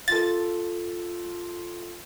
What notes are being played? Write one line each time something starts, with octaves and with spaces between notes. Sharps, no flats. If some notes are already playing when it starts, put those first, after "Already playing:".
F4 A4 A6